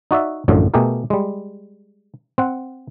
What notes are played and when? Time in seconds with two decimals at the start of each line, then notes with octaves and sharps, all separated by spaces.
0.11 D#4 F#4 D5 E5
0.48 A1 F#2 A2 D3 F3
0.74 B2 A3 G4 G#4 A#4
1.10 G3 G#3
2.38 C4 F#5